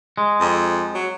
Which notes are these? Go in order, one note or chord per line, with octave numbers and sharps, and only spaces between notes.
G#3
F2
F#3